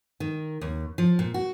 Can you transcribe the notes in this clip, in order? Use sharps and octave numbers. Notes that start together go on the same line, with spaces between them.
D#3
D#2
F3
A#2
F#4